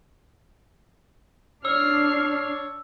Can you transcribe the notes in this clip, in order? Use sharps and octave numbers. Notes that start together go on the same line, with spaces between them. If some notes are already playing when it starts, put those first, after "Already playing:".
D4 C#5 E6 F6 C7